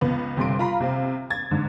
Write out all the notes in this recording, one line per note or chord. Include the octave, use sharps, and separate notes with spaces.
C#2 B3
G1 C3 C6 D7
F4 F5 A#5 B5
C3 C4 F5
G#6 A6
G#2 D3